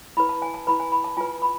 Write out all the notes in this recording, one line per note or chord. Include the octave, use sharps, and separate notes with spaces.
E4 B4 B5
A5
G#5
A5
E4 B4 B5
G#5
B5
A5
F4 B4 G#5
B5